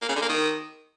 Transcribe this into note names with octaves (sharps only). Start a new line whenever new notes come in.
A#3
C#3
D3
A#3
D#3